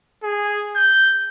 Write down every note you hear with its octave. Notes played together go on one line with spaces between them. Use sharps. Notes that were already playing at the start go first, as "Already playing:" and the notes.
G#4
G6